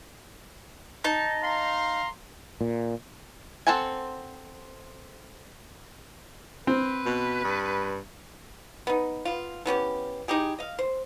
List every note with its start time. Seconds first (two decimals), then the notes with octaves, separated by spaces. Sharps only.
1.04 D#4 A5
1.43 F5 A#5 C6
2.61 A#2
3.67 C4 A4 C5 F#5 G#5
6.67 C4 B4
7.06 B2
7.44 G2
8.87 B3 D#4
9.25 B3 F4
9.66 E3 B3 C#4 G4
10.28 D#4 E4 G4 G#4
10.59 D#5 F5
10.79 C5